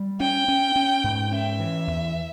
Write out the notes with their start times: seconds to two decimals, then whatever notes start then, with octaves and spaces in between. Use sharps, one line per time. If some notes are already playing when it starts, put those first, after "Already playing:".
Already playing: G3
0.20 C#4 G5
0.48 C#4
0.76 C#4
1.04 G#2
1.32 C#4 E5
1.59 E3
1.87 E2